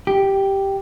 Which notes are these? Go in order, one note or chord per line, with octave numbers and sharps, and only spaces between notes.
G4